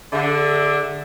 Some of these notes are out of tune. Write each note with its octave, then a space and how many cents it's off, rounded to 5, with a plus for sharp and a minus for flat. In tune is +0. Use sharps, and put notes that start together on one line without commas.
D3 +0 G#4 -40 E5 -10